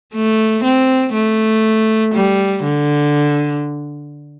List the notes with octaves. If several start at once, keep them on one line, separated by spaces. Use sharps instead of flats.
A3
C4
A3
G3
D3